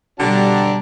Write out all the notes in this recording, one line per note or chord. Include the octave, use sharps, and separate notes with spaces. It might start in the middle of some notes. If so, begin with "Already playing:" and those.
B2 D3 G3 D4 G4 A#5